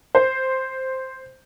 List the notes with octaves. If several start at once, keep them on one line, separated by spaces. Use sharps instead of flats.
C5